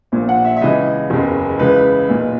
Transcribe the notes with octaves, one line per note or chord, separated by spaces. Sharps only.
A#1 A#2
F#5
E5
E5
C#2 C#3 E3 D#5
F#1 E2 C#3
C#2 C#3 E3 B4
B1 A#2